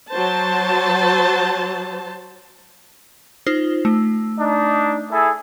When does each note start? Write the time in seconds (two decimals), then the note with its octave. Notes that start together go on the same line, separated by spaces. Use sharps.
0.10 F#3 C5 A5
3.46 D#4 F4 C5
3.85 A3
4.39 D4 D#4
5.11 E4 G#4 A4